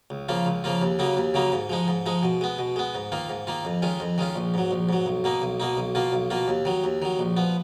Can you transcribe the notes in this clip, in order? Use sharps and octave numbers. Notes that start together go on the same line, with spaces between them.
C#2
C#3 F3 A#3 F4
C#2
C#3 F3 A#3 F4
D#2
C#3 F#3 A#3 D#4
D#2
C#3 F#3 A#3 D#4
G#2
F3 G#3 D#4
G#2
F3 G#3 D#4
B2
G#3 B3
B2
G#3 B3
G#2
D#3 A#3 F4
G#2
D#3 A#3 F4
F2
D#3 G#3 C#4 F4
F2
D#3 G#3 C#4 F4
A#1
G#2 F#3
A#1
G#2 F#3
B1
B2 A#3 D#4
B1
B2 A#3 D#4
B1
B2 A#3 F4
B1
B2 A#3 F4
D#2
D#3 F#3
D#2
D#3 F#3
A#1
F3 B3